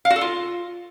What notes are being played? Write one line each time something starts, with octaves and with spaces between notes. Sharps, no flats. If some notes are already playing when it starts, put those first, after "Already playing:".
F5
F#4
A4
F4